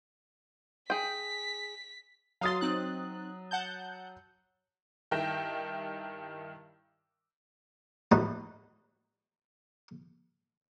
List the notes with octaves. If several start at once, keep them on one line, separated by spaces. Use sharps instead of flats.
G#4 G5 B6
F#3 F5 C6 D#6 A6
C4 D#4 F#6
F#5 A5 G6
G2 D#3 E4 G5 G6 A#6
A2 A3 D#4 F#4 B4